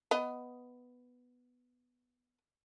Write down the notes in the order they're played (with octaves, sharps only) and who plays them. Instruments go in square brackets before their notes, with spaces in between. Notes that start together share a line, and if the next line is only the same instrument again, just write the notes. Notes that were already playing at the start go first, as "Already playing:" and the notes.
[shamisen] B3 D#5